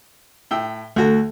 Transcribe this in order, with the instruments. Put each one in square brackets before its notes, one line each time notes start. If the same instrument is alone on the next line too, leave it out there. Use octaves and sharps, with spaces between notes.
[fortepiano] A2 G5 E6
[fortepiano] D2 F#4 [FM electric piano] A3 A4